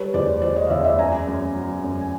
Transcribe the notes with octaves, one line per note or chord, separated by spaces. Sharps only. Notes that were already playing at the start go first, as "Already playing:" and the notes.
Already playing: G3 B4 C#5
E2 C5 D5
E2 C5 D5
C#5 D#5
F5
E2 D5 E5
D5 E5
F#2 G#5 A#5
F#2
F#3
F#2
G#5